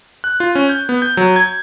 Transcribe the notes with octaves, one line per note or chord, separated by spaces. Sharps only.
F#6
F4
C#4
G6
B3
G6
F#3
G#6